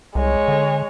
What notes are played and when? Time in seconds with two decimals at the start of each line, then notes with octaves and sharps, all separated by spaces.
0.15 C2 G#3 C#5
0.48 D3